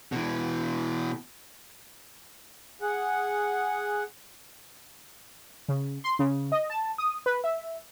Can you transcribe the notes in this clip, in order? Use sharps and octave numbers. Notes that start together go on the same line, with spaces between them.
B2 E3
G#4 F#5
C#3
C6
C#3
D#5
A5
D#6
B4
E5